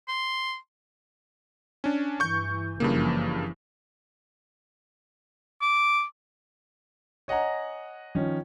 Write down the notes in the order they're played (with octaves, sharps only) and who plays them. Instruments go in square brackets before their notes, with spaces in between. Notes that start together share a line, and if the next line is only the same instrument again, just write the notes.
[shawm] C6
[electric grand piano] C#4 D4
[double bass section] G2 E3 [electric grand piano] C#6 G6
[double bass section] F#1 E3 F3 [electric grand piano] G2 C#3 A#3
[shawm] D6
[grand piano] C#5 D#5 F#5 G#5 A#5
D#3 F3 C#4